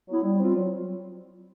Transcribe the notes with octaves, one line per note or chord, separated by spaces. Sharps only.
F#3 B3 E4
G3
C4 F4
F#3